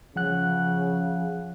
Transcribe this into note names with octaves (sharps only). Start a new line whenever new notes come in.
C#3 F3 F#5 F#6